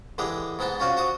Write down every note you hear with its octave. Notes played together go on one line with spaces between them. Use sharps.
D3 E3 G#3 G4 G#4
G#2 G#3 B3 G5 A5
C#4 F4 F#4 C5 D5
F#4 C5 D6 D#6